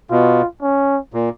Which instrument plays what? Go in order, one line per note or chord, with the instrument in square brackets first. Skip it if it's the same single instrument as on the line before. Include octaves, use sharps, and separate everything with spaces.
[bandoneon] B2 [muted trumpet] F4
[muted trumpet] C#4
[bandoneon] A#2